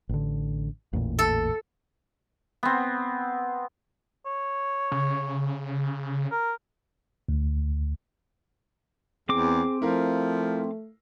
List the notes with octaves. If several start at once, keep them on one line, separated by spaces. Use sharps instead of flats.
A1 D3
A1 E2 A#2
A4
B3 C4
C#5
C#3
A#4
D2
E2 C4 G#4 D6
F3 A3 E4 A#4 F5